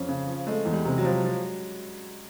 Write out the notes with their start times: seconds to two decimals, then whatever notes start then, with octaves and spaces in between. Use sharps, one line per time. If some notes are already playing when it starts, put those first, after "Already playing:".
Already playing: F2 C#4
0.08 C#3
0.27 F3
0.46 G#3 A3
0.65 E2
0.73 G3
0.85 C3
0.98 F#3
1.05 F3
1.24 F3